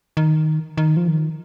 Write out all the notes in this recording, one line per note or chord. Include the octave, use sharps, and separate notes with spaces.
D#3
D#3
F3
D#3